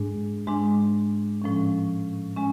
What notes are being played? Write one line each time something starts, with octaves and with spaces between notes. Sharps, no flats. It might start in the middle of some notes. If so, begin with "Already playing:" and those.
Already playing: G#2 G#3 D4
G#2 G#3 D4
A2 F3 G#3 C#4
G#3 C#4